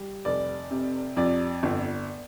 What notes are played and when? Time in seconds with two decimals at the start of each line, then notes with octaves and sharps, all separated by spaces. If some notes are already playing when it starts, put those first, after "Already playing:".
Already playing: G3
0.25 F1 D5
0.71 C3
1.16 F2 D5
1.63 G1